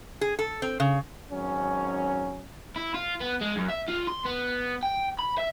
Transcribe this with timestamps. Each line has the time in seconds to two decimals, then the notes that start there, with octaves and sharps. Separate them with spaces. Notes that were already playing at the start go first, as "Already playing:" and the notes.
0.21 G#4
0.39 A4
0.62 C4
0.80 C#3
1.31 G#1 F#3 C#4
2.76 E4
2.94 F4
3.20 B3
3.41 G#3
3.57 F#2
3.70 E5
3.89 F4
4.08 C6
4.26 B3
4.83 G5
5.19 B5
5.38 E5